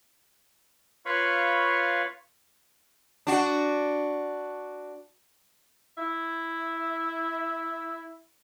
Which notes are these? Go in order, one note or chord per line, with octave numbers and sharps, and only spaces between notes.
F4 B4 C#5 F5 B5 C#6
D4 F#4
E4 E5